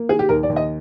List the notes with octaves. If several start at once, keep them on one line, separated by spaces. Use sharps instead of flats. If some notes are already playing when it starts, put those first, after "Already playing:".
Already playing: A#3
D#3 G#4
G4
D#2 A#4
D5
D#2
D#5